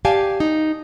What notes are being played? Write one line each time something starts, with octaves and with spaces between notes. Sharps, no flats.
G4 D5 F5 G#5 A5
D#4